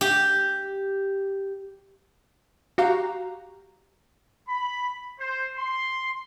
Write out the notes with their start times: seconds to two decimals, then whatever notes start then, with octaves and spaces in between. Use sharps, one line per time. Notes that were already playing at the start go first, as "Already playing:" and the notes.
0.01 G4
2.78 F#4 G4 F5 A#5
4.48 B5
5.18 C5
5.57 C6